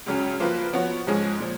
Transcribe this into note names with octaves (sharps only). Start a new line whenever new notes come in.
C#2 C#3 F#3 C#4
F3 A#3 F4 B4
F3 B3 F#4 C#5
G#2 F3 G#3 C#4 G#4
A#2 F3